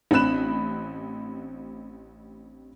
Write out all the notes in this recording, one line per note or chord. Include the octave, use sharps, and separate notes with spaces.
A1 C4 D4 B5 F#6 E7